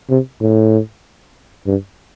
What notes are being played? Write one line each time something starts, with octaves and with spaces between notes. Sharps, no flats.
C3
A2
G2